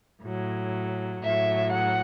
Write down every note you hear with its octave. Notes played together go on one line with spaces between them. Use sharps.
A2 F#3
A2 F#3 E5
F#5